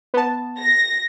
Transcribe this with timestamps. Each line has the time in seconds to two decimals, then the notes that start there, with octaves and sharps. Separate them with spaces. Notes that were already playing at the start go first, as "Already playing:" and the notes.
0.14 B3 A5
0.58 A#6